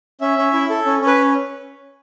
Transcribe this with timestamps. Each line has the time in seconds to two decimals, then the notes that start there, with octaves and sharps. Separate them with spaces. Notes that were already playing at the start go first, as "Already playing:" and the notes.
0.21 C#4 E5
0.38 C#4
0.53 E4
0.70 A4
0.86 C#4
1.01 C#4
1.07 B4